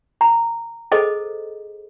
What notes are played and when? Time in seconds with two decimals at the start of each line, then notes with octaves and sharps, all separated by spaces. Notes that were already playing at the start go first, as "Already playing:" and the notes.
0.21 A#5
0.92 G#4 A4 C5 D#5